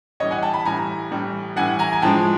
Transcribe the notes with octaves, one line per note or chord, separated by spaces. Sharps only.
A2 E3 G3 C#5 D#5
F#5 G#5
G5 A5
A5 B5
A2 E3 G3 G#5 A#5
A2 E3 G3
A2 E3 G3 F#5 G#5
G#5 A#5
G#5
A2 F3 G#3 G5 A5